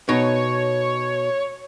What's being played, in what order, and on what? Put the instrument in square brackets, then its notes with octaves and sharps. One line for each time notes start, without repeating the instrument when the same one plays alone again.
[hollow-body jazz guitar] B2 D#4 [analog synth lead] C#5